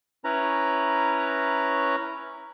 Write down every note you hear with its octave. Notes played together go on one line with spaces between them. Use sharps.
C#4 E4 B4 C#5 A#5